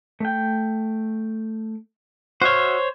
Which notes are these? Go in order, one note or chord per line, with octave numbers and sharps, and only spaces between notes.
A3 G5
F#4 C5 C#5 E5 F6